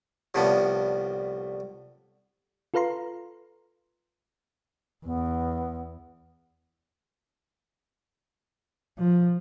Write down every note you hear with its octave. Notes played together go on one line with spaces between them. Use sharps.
C2 A2 D3 F3 B3
F4 A4 B4 F5 A#5 C6
E2 B3
F3